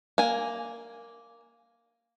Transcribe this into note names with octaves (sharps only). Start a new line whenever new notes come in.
A#3 G#5